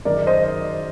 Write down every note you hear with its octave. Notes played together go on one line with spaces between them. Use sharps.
F#1 F#2 D#3 A#4 D5
C5 D#5